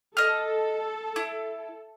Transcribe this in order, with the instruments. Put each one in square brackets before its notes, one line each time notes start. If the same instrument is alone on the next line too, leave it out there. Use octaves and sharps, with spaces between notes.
[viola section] A4 [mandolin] D#5 F6
[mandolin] E4